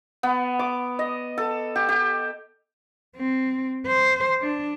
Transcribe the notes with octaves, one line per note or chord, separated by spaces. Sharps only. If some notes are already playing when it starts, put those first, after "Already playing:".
B3
D6
D#5
A4
G4
G4
C4
C5
D4